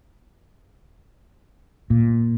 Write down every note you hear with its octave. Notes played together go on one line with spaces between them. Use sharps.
A#2